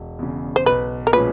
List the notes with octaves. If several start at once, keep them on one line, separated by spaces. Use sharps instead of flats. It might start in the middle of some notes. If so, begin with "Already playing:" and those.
Already playing: E1
E2 C#3
C5
B1 B4
A#4
A#2 F3 G#3 C#4 B4